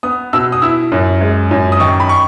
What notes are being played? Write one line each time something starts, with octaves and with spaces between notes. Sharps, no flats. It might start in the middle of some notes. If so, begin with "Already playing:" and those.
B3 D#6
B2 E6
D#6
E4 E6
F#2
G#3
F#2
D#6
D#3 C#6
B5
C#6